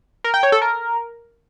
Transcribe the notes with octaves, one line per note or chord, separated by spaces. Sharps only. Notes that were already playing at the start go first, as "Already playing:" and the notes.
A#4
G5
C#5
A4
A#4